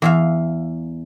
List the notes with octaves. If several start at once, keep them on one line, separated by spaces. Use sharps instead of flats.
E2 E5 F5